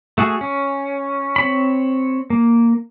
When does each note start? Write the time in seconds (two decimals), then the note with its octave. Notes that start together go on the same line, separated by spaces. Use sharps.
0.18 A3 F#4 G#4
0.41 C#4
1.36 C4 C#5 B5
2.30 A#3